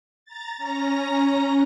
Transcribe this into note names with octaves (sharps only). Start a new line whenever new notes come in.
A#5 A6
C#4 A#5 A#6